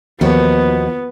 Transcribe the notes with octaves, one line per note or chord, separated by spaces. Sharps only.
D#2 F3 B3 D#4 F#4